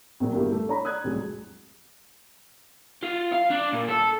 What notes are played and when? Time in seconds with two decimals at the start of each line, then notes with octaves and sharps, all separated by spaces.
0.20 A#1 A#2 F#3
0.33 G2 B2 D3 A#3 E4 G4
0.52 A3
0.68 D4 C#5 A#5 B5
0.84 D5 D#6 F#6 G#6
1.04 C2 F2 A2 F#3 G#3
3.03 F4
3.33 F5
3.51 D4
3.73 A#2
3.89 A4